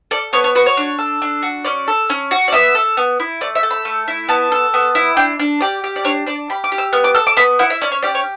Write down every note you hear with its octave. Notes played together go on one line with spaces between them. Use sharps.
A4 D5
B3 C#5
C#5
F#4 B4
C#5
D4
A4
D4
F#4
C#4 D5
A4
C#4
F#4
D5
B3 E5
A4
B3
E4
A3 D5
E5
A4
B5
A3
E4
B3 A5
A4
B3
E4
D4 G5
D4
G4 D5
G4
D5
D4 C#5
D4 D5
G4 B5
D6
G4
E6
B3 F#6
D6
A4 E6
D6
B3 B5
E4 F#5
E5
C#4 D5
C#5
G4 D5
C#5